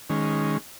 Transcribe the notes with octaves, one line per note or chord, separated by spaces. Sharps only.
D#3 G#3 C#4